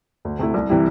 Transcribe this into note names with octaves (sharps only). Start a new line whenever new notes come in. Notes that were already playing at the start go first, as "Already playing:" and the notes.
D2
C3 A3 E4
C2
C3 E3 G3 E4